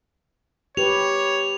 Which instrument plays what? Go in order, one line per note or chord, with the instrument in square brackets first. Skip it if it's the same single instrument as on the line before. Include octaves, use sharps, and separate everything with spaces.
[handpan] G4 B4 [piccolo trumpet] C#5 [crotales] F7